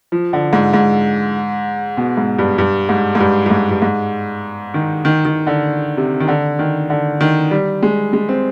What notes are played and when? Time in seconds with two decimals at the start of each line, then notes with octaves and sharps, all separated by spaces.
0.12 F3
0.33 D3
0.53 G#2
0.73 G#2
1.97 B2
2.17 G#2
2.39 G2
2.58 G2
2.89 G#2
3.15 G#2
3.20 G2
3.46 G2
3.51 G#2
3.71 G2
3.82 G#2
4.74 D#3
5.05 D#3
5.25 D#3
5.47 D3
5.97 C3
6.20 D#3
6.28 D3
6.59 D#3
6.90 D3
7.21 D#3
7.51 G3
7.82 G#3
8.13 G#3
8.29 C4